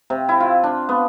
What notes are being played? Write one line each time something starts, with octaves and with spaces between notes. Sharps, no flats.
C3
E4
F4
D4
B3